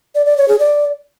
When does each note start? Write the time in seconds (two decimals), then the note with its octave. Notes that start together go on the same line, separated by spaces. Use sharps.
0.15 D5
0.26 D5
0.37 C#5
0.48 G#4
0.59 D5